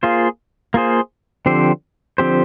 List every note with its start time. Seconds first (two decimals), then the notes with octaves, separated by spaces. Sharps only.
0.03 A#3 F4 G#4 C5
0.74 A#3 F4 G#4 C5
1.46 D3 F3 C4 G4 C5
2.18 D3 F3 C4 G4 C5